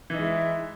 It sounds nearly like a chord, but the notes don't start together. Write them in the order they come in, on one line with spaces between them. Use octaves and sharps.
E3 D#4 G#3 E4